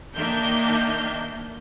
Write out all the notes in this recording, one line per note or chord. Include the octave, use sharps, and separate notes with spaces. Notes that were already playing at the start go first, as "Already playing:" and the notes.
D#3 A#3 D4 E5 G6